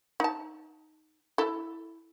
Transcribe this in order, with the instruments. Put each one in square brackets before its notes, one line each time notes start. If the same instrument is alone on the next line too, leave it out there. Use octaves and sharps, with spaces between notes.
[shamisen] D#4 A5
E4 A4